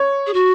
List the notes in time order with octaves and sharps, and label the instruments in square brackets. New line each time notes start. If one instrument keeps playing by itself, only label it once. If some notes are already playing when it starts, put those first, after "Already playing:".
Already playing: [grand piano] C#5
[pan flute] G#4
F#4